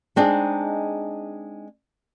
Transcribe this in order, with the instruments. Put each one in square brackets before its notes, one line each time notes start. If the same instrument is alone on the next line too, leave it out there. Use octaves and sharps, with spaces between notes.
[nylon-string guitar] G#3 C4 D4 D#4 G#4